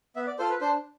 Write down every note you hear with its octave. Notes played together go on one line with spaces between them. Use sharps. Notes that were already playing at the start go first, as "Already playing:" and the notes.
B3 E5
D5
F4 A4 C5
B4
D4 C5